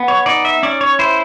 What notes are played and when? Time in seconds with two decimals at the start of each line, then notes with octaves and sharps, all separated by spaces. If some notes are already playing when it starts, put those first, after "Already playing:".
Already playing: B3
0.08 C#5
0.26 D#4 D5
0.45 E5
0.63 C#4 D5
0.81 C#5
0.99 E4 C5